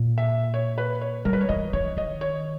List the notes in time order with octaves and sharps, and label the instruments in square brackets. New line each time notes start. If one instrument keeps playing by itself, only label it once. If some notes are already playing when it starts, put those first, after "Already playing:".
Already playing: [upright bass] A#2
[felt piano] E5
C#5
B4
C#5
[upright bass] G3 [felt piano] A#4
[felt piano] B4
C#5
[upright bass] E3 [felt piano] D#5
[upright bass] E3 [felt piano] C#5
[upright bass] D#3 [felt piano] D#5
[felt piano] C#5